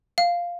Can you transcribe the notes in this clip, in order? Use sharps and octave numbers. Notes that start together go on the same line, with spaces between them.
F5